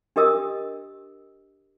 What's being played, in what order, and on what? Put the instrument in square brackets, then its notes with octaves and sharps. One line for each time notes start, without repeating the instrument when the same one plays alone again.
[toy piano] D4 G4 A#4 D#5 D#6 E6